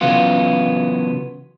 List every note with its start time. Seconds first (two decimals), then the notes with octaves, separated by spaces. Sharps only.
0.01 C#3 E3 F#3 B3 F4